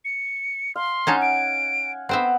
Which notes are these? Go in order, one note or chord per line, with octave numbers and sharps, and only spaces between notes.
C#7
F5 C6
C#4 D#4 F5 F#5 G#5 A5
D7
B3 C4 C5 E5 F#5